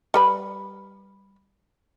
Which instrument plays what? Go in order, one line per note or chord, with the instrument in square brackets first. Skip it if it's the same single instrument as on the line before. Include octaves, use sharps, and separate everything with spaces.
[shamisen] G3 B4 B5